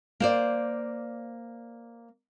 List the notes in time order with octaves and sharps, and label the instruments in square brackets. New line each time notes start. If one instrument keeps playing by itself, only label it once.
[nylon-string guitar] A#3 C5 D5